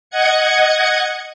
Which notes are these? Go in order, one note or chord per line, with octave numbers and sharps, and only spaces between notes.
D#5 F#5 G#6 C#7